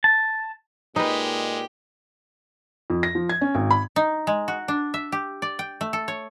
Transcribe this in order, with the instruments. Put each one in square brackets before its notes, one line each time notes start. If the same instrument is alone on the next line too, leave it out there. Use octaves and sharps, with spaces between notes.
[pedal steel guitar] A5
[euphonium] A#2 [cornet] G#3 [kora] D#4 B4 [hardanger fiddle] G4
[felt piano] F2
A#6
F3
G#6
C#4
G#1
B5
[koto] D#4
G#3
F#4
D4
E5
G4
D5
G5
A3
A4
C#5